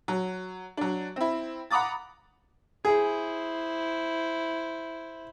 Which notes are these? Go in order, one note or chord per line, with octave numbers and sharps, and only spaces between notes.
F#3
F#3 D4
C4 E4
F#5 A#5 B5 D6 D#6 A6
E4 G#4 C5